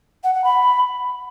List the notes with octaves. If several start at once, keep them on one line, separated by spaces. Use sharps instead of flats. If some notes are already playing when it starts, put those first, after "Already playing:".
F#5
F#5
B5